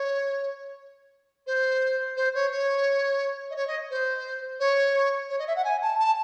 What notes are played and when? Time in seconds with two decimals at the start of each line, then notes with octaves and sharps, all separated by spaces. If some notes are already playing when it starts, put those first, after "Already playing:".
Already playing: C#5
1.47 C5
2.16 C5
2.34 C#5
2.52 C#5
3.51 D#5
3.56 C#5
3.67 D#5
3.91 C5
4.60 C#5
5.30 C#5
5.39 D#5
5.47 E5
5.56 F#5
5.64 G#5
5.82 A5
5.99 A5